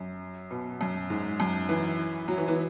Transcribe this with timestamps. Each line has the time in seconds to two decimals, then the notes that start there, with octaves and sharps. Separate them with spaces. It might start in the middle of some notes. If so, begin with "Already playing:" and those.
Already playing: F#2
0.51 B2
0.81 F#2
1.10 G#2
1.40 F#2
1.69 E3
2.28 F#3
2.38 E3
2.48 E3